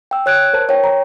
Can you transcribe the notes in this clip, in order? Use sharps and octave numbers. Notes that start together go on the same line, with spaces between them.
G5 E6
C#5 F#6 G#6 D7
A#4 C5 A5
C#5 G5
A#5